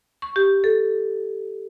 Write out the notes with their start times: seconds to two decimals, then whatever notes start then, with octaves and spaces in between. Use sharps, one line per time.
0.22 C#6
0.36 G4
0.64 A4